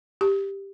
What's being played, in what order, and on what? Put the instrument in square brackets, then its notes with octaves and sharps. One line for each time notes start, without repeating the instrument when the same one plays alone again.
[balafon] G4